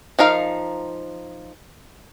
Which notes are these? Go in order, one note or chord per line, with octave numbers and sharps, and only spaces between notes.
F3 D#4 A#4 F5